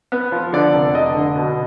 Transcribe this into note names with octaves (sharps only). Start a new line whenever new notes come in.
B3
F3
D3 D5
F1
D3 D#5
D3
B2